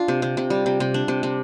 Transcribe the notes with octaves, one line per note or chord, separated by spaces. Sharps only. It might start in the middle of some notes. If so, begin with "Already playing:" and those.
Already playing: D4 F4
C3
C3
C3
G3
C3
C3
D4
C3
C3